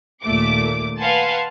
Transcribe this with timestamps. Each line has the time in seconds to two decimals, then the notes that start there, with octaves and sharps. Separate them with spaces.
0.23 D#2 A#2 A3 D6
1.00 B4 F5 F#5 G#5 A5 C6